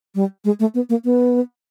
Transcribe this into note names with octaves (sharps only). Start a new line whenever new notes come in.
G3
G#3
A3
B3
A#3
B3